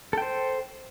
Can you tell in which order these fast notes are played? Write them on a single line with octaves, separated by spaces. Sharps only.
A4 G5 C5